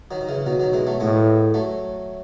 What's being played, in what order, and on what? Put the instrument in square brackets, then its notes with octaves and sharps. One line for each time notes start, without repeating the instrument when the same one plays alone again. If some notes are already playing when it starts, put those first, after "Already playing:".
[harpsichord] D#3 F#3
D#3
C#3 E3
[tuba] B2 [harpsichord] D#3 F#3
[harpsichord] D#3 F#3
E3 G#3
F#3 A3
[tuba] A2 [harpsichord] G#3 B3
[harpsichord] F#3 A3